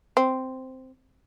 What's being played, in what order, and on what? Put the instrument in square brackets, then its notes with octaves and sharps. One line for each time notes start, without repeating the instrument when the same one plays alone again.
[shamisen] C4